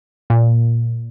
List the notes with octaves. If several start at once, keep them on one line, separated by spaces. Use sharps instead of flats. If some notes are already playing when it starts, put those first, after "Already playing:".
A#2